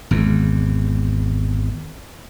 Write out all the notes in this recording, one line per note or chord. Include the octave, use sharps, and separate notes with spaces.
G#1 E2